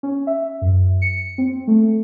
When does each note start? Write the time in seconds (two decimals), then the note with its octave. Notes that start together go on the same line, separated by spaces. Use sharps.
0.03 C#4
0.27 E5
0.61 F#2
1.02 C#7
1.38 C4
1.67 A3